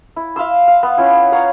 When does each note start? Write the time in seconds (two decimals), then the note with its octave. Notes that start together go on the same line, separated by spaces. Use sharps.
0.16 E4
0.36 E5 F5 C6 E6
0.68 F5
0.83 B3
0.97 C#4 E4 F4
1.32 C#5 F5 F#5 A#5